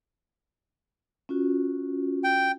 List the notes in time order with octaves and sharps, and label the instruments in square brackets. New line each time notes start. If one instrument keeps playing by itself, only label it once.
[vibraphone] C#4 F4 F#4
[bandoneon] G5